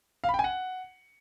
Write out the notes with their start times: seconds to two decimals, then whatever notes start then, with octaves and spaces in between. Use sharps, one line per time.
0.24 F5
0.29 B5
0.34 G5
0.39 G#5
0.44 F#5